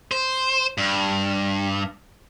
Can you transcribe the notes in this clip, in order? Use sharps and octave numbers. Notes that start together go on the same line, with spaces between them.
C5
G2